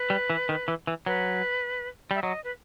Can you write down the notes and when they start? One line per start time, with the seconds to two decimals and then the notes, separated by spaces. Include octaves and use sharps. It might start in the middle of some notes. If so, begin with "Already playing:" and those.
Already playing: B4
0.10 G3
0.30 E3
0.49 D#3
0.68 E3
0.87 E3
1.06 F#3 B4
2.11 G3 E5
2.22 F#3 D#5
2.44 B4